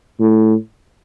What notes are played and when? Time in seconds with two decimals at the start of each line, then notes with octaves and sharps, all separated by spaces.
0.20 A2